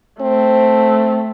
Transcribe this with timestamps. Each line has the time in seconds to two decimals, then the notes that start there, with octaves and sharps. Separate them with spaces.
0.21 A3 C4